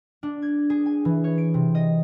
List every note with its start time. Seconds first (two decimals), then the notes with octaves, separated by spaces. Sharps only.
0.23 D4
0.42 G#6
0.70 G#4
0.86 G#5
1.05 E3
1.24 C#5
1.38 D7
1.54 C3
1.75 D#5